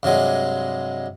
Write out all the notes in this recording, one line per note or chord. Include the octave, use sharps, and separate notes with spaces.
G2 C3 F#3 G#3